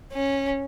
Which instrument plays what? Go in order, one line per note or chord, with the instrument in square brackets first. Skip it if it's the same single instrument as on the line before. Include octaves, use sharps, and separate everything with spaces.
[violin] C#4